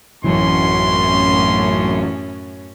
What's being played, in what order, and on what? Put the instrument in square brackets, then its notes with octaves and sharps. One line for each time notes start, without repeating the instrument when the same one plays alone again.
[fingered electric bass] A1 F#3 [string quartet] F#2 A2 C#4 [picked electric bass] E3 [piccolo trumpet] C6